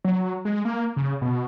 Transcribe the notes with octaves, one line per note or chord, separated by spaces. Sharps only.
F#3
G#3
A#3
C#3
B2